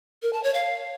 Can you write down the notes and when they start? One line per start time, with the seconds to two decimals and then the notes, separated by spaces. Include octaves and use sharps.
0.22 A#4
0.33 A5
0.44 C#5
0.54 F5